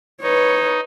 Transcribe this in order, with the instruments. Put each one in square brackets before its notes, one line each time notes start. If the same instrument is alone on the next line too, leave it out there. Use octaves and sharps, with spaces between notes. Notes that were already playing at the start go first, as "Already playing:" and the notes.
[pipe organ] D#4 [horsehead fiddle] B4 C#5